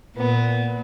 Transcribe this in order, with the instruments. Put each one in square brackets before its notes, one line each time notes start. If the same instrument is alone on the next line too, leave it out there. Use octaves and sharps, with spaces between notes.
[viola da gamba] A#2 [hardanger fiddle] B3